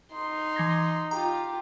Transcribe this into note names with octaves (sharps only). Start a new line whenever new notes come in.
D#4 C6
E3 G#6 A#6
F4 G4 A#5